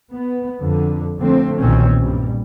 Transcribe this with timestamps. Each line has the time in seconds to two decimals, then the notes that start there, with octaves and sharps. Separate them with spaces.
0.14 B3
0.63 F2 D3
1.21 D3 F3 A3 C4
1.61 B1 A#2 D#3 C4 C#4
2.00 G2 A#2 G3